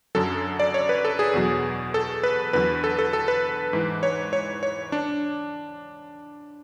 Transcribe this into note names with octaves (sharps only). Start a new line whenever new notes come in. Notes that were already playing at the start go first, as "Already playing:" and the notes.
F#2 D3 F#3 A4
D5
C#5
B4
A4
G#4
E2 B2 F#3
A4
B4
E2 D3 F#3 B4
A4
A4
A4
B4
G#2 E3
C#5
C#5
C#5
D4